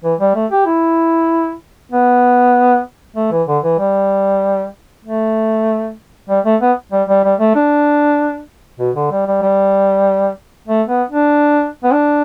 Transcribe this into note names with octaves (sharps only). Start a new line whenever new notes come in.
E3
G3
A3
G4
E4
B3
A3
E3
D3
E3
G3
A3
G3
A3
B3
G3
G3
G3
A3
D4
B2
D3
G3
G3
G3
A3
B3
D4
B3
D4